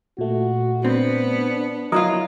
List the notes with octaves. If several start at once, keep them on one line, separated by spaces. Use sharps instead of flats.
A#2 A3 F#4
B3 C4 D4
F#3 E4 F4 A#4 D#5